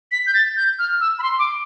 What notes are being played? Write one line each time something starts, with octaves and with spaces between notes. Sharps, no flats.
B6
G6
A6
G6
F6
E6
B5
C6
D6